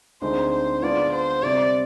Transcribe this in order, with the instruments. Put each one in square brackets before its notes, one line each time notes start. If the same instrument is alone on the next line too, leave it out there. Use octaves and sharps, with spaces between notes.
[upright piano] D2 D3 G#3 C4 D#4 [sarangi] C5
[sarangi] C5
[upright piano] D3 G#3 B3 D4 F4 [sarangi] D5
[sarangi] C5
[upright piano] C3 G3 C4 [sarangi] D5